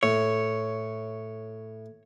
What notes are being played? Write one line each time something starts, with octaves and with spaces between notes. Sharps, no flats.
A2 C#5